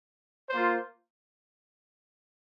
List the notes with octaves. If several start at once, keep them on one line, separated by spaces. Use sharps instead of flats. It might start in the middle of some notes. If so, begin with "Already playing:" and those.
A#3 F4 C5